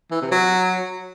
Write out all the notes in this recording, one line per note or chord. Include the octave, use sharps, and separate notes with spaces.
E3
C3
F#3